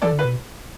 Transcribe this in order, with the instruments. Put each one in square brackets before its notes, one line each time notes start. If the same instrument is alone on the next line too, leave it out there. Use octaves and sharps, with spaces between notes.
[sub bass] E3 [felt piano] A4 D5
[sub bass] D3
[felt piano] B4
[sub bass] B2